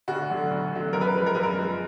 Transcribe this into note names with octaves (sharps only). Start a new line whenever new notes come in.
D2 F#4
D3 F#3
D2
D3 F#3
F#2 A#4
B4
A#4
F3 G#3 B4
A#4
F#2 B4
A#4
F3 G#3